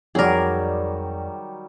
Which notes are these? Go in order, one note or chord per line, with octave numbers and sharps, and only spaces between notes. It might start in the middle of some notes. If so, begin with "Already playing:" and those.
F2 D#3 F#3 G3 G#4 A#4 D5